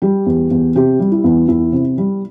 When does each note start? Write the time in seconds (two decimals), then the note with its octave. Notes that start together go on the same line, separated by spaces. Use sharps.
0.02 G3 G4
0.26 E2
0.51 E2
0.75 C3 G4
1.00 G3
1.12 E4
1.24 E2
1.48 E2 E4
1.72 C3
1.98 G3